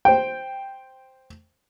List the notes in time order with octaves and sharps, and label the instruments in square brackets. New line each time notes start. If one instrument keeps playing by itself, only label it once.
[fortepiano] C5 G5